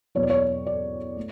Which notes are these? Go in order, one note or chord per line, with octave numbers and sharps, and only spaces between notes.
E2 B2 F#3 C#5
D5
C#5
D5
A3